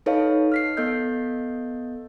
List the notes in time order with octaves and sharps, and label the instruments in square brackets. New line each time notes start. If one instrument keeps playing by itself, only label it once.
[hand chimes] D#4 A4 B4 C#5 D#5 F5
F6 B6 C7
B3 A4 D#5 E6 G6